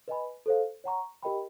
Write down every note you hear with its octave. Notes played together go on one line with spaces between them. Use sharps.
B4 D#5 G#5 B5
A4 C5 F5
C#5 F#5 A#5 C#6
G4 A#4 D#5 G5 B5